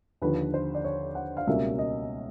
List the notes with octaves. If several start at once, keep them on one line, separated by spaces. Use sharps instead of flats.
D#2 D3 F3 B4
C5
D5
C#5
F#5
F5
C#2 B2 G3 A#3 C#4 E5
D#5